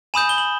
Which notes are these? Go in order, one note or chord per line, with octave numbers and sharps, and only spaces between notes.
G#5 B5 D#6 G6 E7
G7
F#7